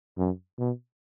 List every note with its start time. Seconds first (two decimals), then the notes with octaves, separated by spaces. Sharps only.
0.18 F#2
0.59 B2